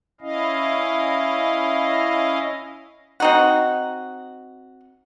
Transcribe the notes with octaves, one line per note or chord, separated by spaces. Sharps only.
C#4 E4 D#5 F5
C4 D#4 F#4